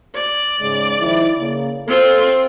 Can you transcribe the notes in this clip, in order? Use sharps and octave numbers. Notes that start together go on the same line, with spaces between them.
D5
G#2 C#3 G#3
D#3 F3 E4
C#3 A#3
C4 F4 A4